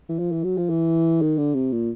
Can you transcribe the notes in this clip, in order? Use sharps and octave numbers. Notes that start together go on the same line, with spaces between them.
E3
F3
E3
F#3
F3
E3
D#3
D3
C3
A#2